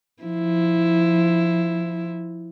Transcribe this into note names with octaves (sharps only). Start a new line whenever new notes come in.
F3 E4